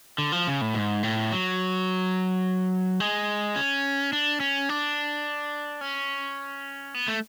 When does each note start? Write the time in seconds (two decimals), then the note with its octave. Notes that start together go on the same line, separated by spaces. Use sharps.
0.18 D3
0.32 F3
0.47 C#3
0.61 A2
0.74 G#2
1.03 A2
1.32 F#3
3.00 G#3
3.56 C#4
4.13 D4
4.40 C#4
4.69 D4
5.81 C#4
6.94 B3
7.08 A3